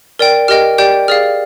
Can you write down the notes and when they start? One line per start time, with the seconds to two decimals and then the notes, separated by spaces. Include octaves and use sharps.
0.19 A#4 D5 G5
0.48 G4 A#4 D#5 G5 F6
0.78 G4 D5 G5 G6
1.08 G#4 D5 F5 F6